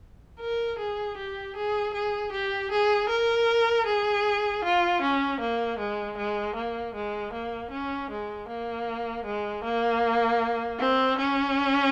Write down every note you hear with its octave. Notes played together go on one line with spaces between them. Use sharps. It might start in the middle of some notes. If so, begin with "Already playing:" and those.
A#4
G#4
G4
G#4
G#4
G4
G#4
A#4
G#4
F4
C#4
A#3
G#3
G#3
A#3
G#3
A#3
C#4
G#3
A#3
G#3
A#3
C4
C#4